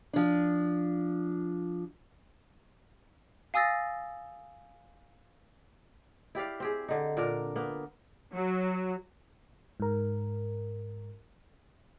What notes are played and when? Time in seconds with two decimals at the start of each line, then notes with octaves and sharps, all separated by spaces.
0.13 F3 D4
3.54 F5 G#5 D#6 E6 A6 A#6
6.35 E4 G4 D5 F5
6.60 C4 G4 G#4
6.88 D3 D#4
7.17 A#2 D4 A#4
7.56 A#3 B3
8.33 F#3
9.80 G#2 A#4